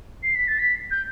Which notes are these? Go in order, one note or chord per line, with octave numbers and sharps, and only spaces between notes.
C7
B6
A6
B6
G6